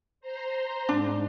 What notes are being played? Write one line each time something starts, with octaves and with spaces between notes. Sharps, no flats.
C5 A#5 C6
G#2 D4